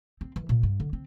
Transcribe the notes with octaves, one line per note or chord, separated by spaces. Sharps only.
C4
E3
A#2
G2
D3
C4